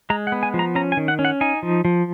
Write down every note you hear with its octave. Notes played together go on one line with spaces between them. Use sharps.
G#3 A#5
F#5
B3
G#5
F3
A#5
C#4 A#5
G#5
D#3
F#5
C#4
F#5
D#4 G#5
F3
F3